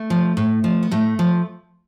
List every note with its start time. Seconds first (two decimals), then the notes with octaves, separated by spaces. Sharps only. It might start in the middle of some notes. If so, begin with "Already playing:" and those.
Already playing: A3
0.10 F3
0.37 A2
0.64 F3
0.83 B3
0.91 A2 A3
1.19 F3